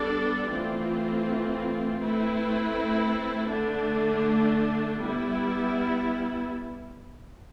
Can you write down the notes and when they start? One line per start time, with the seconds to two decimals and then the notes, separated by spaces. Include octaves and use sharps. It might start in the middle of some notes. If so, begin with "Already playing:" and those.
Already playing: G3 B3 D4 A4 D5
0.50 E3 A3 C4 F4
2.00 A3 C4 E4 B4
3.50 D3 A3 D4
5.01 G3 B3 E4